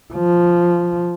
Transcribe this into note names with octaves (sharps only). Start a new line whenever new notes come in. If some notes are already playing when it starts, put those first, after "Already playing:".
F3